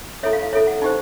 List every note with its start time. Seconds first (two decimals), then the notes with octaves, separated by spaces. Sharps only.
0.23 E4 A4 C#5 E5
0.33 F5
0.43 F5
0.53 E4 A4 C#5 E5
0.67 F#5
0.82 D#4 G4 C5